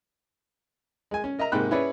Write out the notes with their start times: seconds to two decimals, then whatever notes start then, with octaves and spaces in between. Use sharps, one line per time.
1.11 G#3 G#5
1.24 C#4
1.39 A#4 D#5 E5 A#5
1.52 G#2 C3 A#3 G5 B5 F#6
1.71 C#4 E4 G#4 B4 C#5 D5